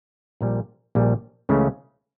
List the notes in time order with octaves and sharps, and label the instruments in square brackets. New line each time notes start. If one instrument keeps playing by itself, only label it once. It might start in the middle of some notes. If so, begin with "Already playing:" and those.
[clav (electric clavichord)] A#1 A#2 G3
A#1 A#2 G3
C#2 C#3 E3 A3 C#4